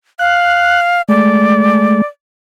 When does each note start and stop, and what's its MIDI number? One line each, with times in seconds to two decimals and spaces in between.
0.19 1.02 77
0.19 0.81 90
1.09 2.02 56
1.09 2.02 57
1.09 2.06 74